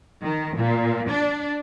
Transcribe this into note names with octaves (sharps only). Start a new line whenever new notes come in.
D#3
A#2
D4